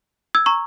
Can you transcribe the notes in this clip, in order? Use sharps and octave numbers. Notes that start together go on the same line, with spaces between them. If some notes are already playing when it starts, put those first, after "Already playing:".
E6 G#6
A#5 C#6